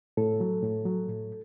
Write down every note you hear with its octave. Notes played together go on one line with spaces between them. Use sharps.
A2 A4
F#3
A2
F#3
A2